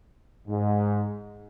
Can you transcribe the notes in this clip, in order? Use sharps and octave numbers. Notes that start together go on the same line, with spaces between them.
G#2